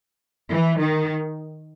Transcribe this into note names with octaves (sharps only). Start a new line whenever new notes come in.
E3
D#3